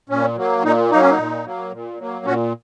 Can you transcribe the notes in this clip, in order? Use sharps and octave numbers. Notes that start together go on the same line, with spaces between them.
A#2 C#4
F#3 A#3
A#2 D#4
F#3 A#3 D#4
C#4
D#4
A#2
F#3 A#3
A#2
F#3 A#3
A#2 C#4 F#4